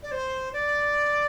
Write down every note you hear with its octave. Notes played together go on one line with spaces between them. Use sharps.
D5
C5
D5